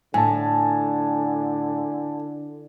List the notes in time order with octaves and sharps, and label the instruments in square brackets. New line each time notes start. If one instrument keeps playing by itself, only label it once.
[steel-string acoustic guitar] A2 [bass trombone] D3 [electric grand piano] G#5 A5